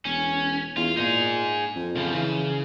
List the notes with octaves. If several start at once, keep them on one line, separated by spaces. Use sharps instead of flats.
E1 C#4
E2 F4
A#2 D#4 G#4
F2
C#3 F3
C#3 E3